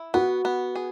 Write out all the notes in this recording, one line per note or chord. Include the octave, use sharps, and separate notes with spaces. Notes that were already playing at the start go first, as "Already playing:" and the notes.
Already playing: E4
B3 F#4
B3
G#4